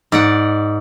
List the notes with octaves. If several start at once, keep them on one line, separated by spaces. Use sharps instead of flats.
G#2 D5 F#5